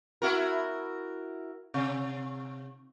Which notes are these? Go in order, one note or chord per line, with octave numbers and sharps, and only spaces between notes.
E4 F#4 A#4
C3